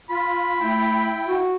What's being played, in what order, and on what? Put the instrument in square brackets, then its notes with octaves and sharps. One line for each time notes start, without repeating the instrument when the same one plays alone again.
[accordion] F4 [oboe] B5
[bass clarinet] A3 [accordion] E4 G5
[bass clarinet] F#4